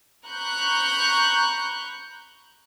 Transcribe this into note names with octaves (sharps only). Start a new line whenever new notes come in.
A#5 B5 C#6 F#6 G6